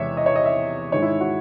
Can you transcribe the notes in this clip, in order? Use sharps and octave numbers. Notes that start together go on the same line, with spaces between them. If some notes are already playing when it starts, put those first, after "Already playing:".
Already playing: E2 C3 G#3 C#5 E5
D#5
C#5
D#5
E5
G#2 D#3 G#3 C#5
E4
F#4